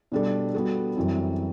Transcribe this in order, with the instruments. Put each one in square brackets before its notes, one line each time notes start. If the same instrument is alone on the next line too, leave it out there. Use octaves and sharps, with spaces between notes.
[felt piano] B2 G3 D4 A4
G3 B3 F#4 A4
F#2 E3 G3 C4